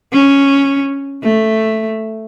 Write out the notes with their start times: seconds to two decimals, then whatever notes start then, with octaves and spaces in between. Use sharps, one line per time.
0.12 C#4
1.23 A3